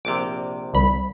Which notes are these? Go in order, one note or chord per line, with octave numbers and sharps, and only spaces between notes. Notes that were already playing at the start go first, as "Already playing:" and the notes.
A#1 C3 D6
C2 B5